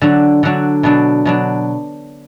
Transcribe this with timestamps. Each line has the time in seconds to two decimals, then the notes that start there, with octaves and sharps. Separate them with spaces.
0.01 D3 F#3 D4 F#4
0.43 D3 F#3 D4 F#4
0.83 B2 F#3 D4
1.25 B2 F#3 D4